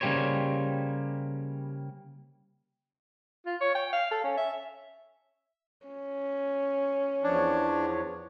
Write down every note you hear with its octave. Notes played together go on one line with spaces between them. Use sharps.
C#3 G3 A#3 G4 C5 C#5
F4
C#5
G5
F5
A4
C#4
E5
C#4
E2 F3 D4 C#5